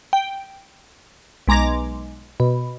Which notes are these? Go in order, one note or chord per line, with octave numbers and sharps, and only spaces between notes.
G5
B1 G#3 A#5 D6 A#6
B2